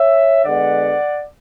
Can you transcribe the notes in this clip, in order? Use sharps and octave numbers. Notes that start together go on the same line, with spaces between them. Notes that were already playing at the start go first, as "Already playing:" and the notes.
Already playing: C#5 E5
D3 G#3 B3 D5 F#5